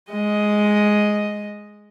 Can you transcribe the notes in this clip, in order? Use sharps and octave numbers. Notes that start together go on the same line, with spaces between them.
G#3 D#5